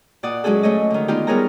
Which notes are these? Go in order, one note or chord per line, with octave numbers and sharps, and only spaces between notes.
A#2 D5 F#5 D#6
F#3 G#3 C#4 G#4 A4
A3 C#5 D#5
D3 D#3
B3 D#4 F4 G4
G3 B3 G#4 A#4 C#5 A#5